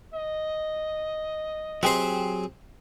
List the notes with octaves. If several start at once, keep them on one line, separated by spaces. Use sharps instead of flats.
D#5
F#3 C4 G4 G#4 C5